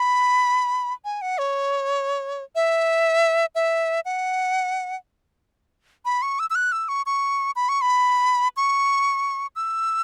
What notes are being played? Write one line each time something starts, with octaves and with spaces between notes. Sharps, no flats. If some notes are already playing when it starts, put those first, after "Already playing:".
Already playing: B5
G#5
F#5
C#5
E5
E5
F#5
B5
C#6
E6
E6
F#6
E6
C#6
C#6
B5
C#6
B5
C#6
E6